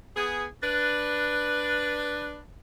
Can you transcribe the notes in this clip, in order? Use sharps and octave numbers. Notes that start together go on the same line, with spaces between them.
B3 G#4
D4 B4